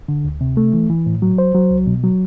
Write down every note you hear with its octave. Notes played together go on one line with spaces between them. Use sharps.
D3
D2
C3
A3
E3
E3
A2
F#3
C5
F#3
C2
B2
F#3